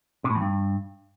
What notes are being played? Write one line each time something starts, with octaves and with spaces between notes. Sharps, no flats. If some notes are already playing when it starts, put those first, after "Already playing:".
C3
A2
E2
G2